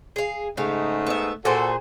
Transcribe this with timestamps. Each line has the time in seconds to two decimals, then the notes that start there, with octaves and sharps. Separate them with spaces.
0.16 G#4 F5
0.57 G#2 C#3 A3 D#4 F5
1.07 B3 E5
1.45 A#2 F#4 G#4 A4 C5